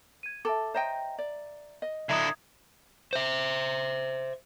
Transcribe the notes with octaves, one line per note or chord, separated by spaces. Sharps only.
G#6 D#7
A4 E5 A5 D6
C5 C#5 D#5 E5 G5 A#5
D5
D#5
D3 E4 E5 A#5 D#6 G#6
C5 E5